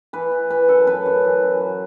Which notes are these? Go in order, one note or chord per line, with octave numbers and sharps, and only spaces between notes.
E3 B4
E3
E3 B4
F#2 A4
F#2 B4
F#2
E3
F#2
F#3